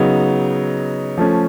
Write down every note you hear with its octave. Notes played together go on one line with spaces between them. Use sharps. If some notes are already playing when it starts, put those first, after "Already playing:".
Already playing: C#3 F#3 B3 D#4
F3 A3 C#4